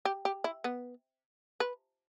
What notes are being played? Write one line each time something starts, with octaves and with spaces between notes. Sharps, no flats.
G4
G4
E4
B3
B4